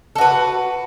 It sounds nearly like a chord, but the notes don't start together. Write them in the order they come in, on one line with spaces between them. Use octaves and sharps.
A4 F#4 B4